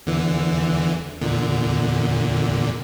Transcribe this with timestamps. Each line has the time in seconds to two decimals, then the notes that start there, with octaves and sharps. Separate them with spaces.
0.06 E2 D3 E3
1.21 E2 A#2 D3